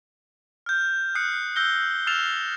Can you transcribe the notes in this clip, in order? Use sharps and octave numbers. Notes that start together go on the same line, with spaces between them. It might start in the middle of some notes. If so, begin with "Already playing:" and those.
F6 G6
D#6 F6 F#6 C7 C#7
E6 F#6 G6 A#6 G7
E6 F6 A6 C7 E7 F7